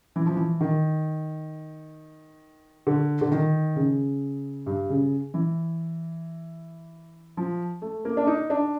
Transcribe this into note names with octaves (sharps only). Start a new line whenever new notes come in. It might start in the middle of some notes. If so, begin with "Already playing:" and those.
E3
F3
E3
D#3
D3
D3
D#3
C#3
G2
C#3
E3
F3
A3
A#3
D4
D#4
D4